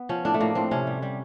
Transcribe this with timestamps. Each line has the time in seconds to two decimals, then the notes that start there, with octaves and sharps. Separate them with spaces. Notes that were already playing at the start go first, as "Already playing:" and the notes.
Already playing: B3
0.09 F3 C#4
0.25 A2 D4
0.34 A3
0.40 A2 A#3
0.55 A2 C4
0.71 C3 C#4
0.87 G3
1.02 G3